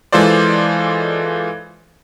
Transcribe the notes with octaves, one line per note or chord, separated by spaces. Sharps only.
E3 G#3 F4 A4 C5 D5